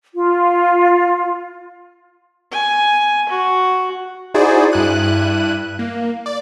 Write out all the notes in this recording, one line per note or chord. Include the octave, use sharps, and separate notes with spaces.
F4
G#5
F#4
D#4 E4 F#4 G#4 C5 D5
G2 E4 F#6 D#7
A#3
D5